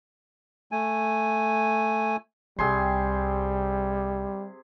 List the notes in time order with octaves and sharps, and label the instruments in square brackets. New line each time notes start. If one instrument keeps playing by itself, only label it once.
[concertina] A3 G#5
[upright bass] C2 [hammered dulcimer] C3 G#4 C6 [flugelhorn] G3